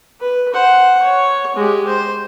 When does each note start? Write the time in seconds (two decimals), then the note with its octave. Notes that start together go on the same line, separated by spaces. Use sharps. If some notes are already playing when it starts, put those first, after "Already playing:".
0.21 B4
0.53 C5 F#5
1.02 C#5
1.56 G#3 G4
1.87 C5